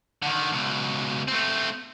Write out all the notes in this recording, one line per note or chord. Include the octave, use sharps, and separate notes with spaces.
D3 D#3
C#2 B2
A3 C4